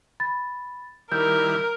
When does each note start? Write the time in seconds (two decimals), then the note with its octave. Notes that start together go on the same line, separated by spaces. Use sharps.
0.20 B5 A6
1.12 D#3 G3 E4 A#4 G6